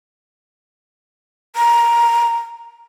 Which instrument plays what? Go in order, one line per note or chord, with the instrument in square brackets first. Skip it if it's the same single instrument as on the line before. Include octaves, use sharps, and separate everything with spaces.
[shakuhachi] A#5